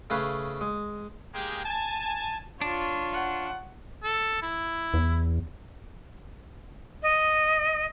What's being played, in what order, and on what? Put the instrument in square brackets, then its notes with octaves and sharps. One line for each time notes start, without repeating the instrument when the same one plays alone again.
[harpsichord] C#3 A3 C#4 B4 F5
G#3
[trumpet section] G#3 A#3 G4 G#4 G5
G#5 A5
[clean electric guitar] D4 [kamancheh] F4 C#5
[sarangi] F#5
[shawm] A4
E4
[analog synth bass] E2
[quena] D#5